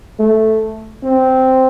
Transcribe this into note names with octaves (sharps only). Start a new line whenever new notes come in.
A3
C4